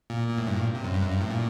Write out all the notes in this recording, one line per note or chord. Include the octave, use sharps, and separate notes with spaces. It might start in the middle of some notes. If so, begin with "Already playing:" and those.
A#2
A#2
A2
G2
A#2
C3
F#2
G2
F#2
G2
A2
A#2